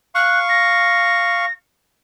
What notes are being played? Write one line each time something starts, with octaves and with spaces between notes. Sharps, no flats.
F5 C#6 F#6
A#6